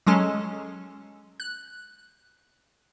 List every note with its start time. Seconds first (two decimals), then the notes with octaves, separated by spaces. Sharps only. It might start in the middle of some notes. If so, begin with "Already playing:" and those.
0.07 F#3 G#3 C#4 A4
1.40 F#6